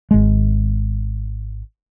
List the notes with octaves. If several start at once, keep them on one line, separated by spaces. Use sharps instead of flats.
G#1 G#3